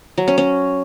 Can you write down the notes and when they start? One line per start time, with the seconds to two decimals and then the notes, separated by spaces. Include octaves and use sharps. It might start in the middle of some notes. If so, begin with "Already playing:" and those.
0.18 F#3
0.28 C#4
0.38 C#4